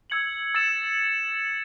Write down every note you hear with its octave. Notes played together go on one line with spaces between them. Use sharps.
E6 G#6 C#7 F#7
E6 A6 C#7 E7